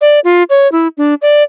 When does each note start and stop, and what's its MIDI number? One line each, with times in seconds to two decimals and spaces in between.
0.01 0.20 74
0.24 0.43 65
0.50 0.70 73
0.72 0.88 64
0.97 1.14 62
1.22 1.43 74